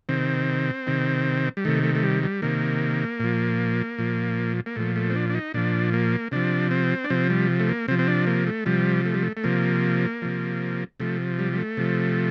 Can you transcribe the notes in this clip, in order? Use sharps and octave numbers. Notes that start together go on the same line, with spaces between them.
C3 D#3 C4
C3 D#3
G3
C3 D#3 A3
A3
A3
G3
G3
C3 D#3 A#3
A#2 F3
A#2 F3
A#3
A#2 F3 A3
A3
C4
D4
D4
D#4
A#2 F3 D4
A#3
C3 F3 D4
C4
D4
C3 F3 C4
G3
A3
A#3
C3 F3 C4
C4
D4
A#3
A3
C3 F3 G3
A3
G3
A3
A3
C3 F3 A#3
C3 F3
C3 F3 A3
G3
G3
A3
C3 F3